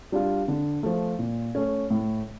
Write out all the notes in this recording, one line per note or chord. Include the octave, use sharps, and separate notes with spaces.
G3 D4 F4
D3
F3 A3
A#2
A3 C#4
A2